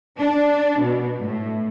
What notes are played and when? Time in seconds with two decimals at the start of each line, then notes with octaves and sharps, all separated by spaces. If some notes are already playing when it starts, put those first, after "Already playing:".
0.19 D4
0.82 B2
1.19 A2